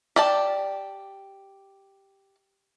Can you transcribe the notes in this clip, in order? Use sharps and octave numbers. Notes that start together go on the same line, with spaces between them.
G4 D5 A5